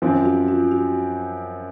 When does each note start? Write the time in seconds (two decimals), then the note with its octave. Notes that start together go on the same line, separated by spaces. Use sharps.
0.02 F#2 F3 C4
0.26 F#4
0.48 F4
0.72 F#4